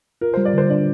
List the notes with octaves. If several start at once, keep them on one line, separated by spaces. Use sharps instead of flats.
F4 A#4
G3 C5
D5
D3 C5
D4 D5